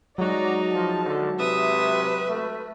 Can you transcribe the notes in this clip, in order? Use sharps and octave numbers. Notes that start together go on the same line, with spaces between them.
F#3 G#3 D#4 F#4 D5 A#5
F3 A5
D3
C3 B4 E5 D#6
A3